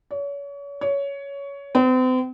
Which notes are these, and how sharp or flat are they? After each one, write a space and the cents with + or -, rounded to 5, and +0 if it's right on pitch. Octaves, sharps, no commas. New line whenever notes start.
C#5 +35
C#5 +15
C4 -40